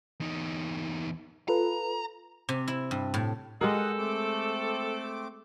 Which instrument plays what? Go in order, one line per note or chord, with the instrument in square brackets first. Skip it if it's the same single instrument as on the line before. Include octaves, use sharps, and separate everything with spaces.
[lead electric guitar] E2 D#4
[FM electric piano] F4 A4 B4 [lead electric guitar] A#5
[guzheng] C3
E4
G2
A2
[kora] G#3 G4 A#4 [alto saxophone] A4 [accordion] D#5 F#5
[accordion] A3 C4 D6